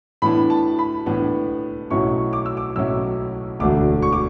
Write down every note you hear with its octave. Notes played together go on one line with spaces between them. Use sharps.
A2 E3 B3 D4 B5
A5
B5
A2 E3 B3 D4
B1 A2 F#3 C#4 E4 C#6
D6
E6
D6
B1 A2 F#3 C#4 E4 E6
E1 D2 D3 A3 D4 D6
C#6
D6